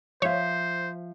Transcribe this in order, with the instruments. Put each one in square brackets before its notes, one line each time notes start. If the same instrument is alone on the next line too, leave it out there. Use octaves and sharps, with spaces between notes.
[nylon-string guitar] F3 E5 F5 [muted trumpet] C5 [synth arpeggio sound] C#5